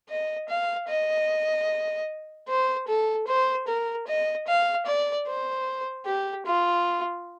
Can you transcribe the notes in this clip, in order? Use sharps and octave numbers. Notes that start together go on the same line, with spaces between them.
D#5
F5
D#5
C5
A4
C5
A#4
D#5
F5
D5
C5
G4
F4